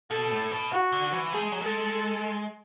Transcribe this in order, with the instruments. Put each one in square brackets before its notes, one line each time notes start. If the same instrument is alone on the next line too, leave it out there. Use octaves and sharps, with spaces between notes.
[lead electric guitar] B2 [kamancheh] A4
[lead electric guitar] A2
B2
[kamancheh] F#4
[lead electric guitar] D3
E3
[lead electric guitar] A3 [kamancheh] G#4
[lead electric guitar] G#3
F#3
[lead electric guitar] G#3 [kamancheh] A4